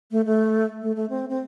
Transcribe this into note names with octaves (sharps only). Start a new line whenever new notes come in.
A3
A3
A3
A3
C4
C4